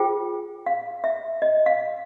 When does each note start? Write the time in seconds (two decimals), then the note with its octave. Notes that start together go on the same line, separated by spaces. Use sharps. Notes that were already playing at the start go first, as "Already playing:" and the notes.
Already playing: F4 G#4 C5 G5
0.66 F5
1.04 E5
1.42 D#5
1.66 F5